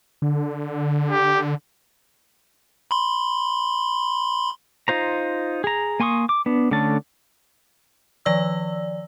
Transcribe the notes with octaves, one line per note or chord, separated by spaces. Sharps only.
D3
G4
B5 C6
D#4 F4 C5 A#5
G#4 A#5
A#3 G#5 C6 C#6 D#6
D6
B3 D4
D3 A3 C#4 A5
D#3 F3 D5 E6